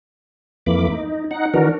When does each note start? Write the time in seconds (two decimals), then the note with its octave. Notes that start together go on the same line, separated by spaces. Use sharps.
0.66 F2 E3 A3 A#3 B5 D6
0.91 D#4
1.31 D#4 F#5
1.54 D#3 E3 D4 F#4 A#4